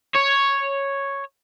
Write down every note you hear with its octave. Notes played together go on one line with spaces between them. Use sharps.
C#5